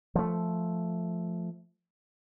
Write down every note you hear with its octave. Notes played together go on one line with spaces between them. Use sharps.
F3 A3